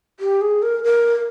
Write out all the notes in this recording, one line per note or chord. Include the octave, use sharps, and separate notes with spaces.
G4
G#4
A#4
A#4